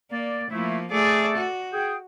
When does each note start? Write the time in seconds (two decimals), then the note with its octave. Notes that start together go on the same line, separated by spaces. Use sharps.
0.12 A#3 D5
0.51 F3 A3 A#3 E4
0.91 A3 G#4 A4 D5
1.37 F#4
1.73 G#4 G5